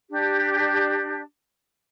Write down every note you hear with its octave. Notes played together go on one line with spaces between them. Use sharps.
D4 G4